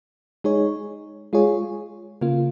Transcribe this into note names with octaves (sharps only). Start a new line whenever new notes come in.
G#3 D#4 G#4 C#5
G#3 F4 G#4 C#5
C#3 A#3 F4